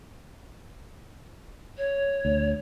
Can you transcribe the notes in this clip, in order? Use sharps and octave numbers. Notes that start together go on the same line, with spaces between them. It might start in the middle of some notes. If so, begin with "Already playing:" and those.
C#5
D2